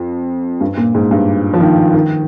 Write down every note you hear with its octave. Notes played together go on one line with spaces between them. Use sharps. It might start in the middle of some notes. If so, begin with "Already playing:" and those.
Already playing: F2
G2
A#2
G#2
G2
F3
D#3
D#3